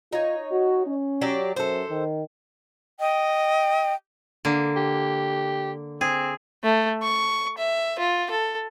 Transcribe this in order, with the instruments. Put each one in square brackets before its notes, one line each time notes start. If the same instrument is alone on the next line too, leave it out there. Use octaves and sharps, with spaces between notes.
[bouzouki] D#4 C#5 [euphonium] F4
[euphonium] F#4
C#4
[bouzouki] F#3 G4 D5
[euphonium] F#2 [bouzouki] A4 C5
[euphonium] D#3
[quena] D#5 [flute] G5
[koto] D3 A#3
[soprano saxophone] G4
[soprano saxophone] C4 [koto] G#4
[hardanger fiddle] A3
C#6
E5
F4
A4